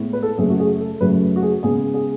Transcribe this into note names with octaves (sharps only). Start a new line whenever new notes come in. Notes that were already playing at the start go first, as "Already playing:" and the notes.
Already playing: A2 G#3 B3
B4
A4
F#2 C#3 F#3 A3 G#4
F#4
G#4
A4
F#2 C#3 F#3 A3 B4
F#4
G#4
C#3 G#3 B3 G#4
G#4